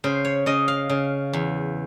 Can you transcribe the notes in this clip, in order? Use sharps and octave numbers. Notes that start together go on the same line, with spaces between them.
C#3 C5
C#5
C#3 D#5
F5
C#3
E2